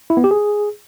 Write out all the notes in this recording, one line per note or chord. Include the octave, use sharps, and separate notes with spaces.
E4
B3
G4
G#4